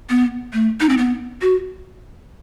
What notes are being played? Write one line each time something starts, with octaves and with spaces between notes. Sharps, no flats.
B3
A3
D#4
C4
B3
F#4